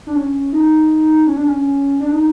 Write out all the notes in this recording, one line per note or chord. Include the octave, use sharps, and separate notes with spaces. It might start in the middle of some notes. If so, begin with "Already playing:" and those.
D4
C#4
D#4
C#4
D4
C#4
D4
D#4